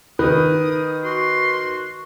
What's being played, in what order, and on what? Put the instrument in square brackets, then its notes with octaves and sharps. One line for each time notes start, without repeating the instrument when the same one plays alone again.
[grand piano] D#3 [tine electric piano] B4 [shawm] D#6
[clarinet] F#4 [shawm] C6